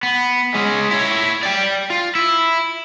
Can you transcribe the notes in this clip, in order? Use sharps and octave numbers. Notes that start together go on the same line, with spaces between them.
B3
G#3 C#4
E4 C#5
D5 G5
F4
E4